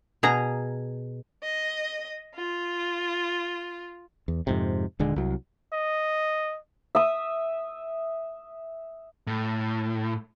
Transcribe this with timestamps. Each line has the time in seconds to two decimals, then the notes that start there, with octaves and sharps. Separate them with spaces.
0.23 B2 G#4 A#5
1.43 D#5
2.35 F4
4.28 E2
4.47 F2 G#2 C3
4.99 D#1 D3 G#3
5.16 C2 F#3
5.73 D#5
6.95 E5 D#6
9.27 A2